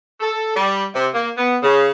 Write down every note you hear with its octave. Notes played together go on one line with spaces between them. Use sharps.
A4
G3
C3
A#3
B3
C#3